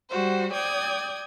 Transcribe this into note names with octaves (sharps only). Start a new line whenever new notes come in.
G3 F#4 C5
D5 G5 D#6 G#6